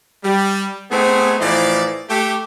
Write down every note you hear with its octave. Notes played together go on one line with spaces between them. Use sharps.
G3
A3 B3 C4 D#4 G#4
A2 E3 F3 D#4 D5
A3 G4